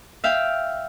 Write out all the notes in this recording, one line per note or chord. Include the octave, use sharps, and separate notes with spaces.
E5 F5 G5